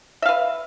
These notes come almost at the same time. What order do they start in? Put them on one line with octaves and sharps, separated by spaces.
E5 F5 B4